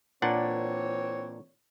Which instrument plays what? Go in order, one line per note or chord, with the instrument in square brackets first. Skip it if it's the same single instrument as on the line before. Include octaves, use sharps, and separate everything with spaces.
[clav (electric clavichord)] A#2 D4 F#5 [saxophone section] E3 C4 C#5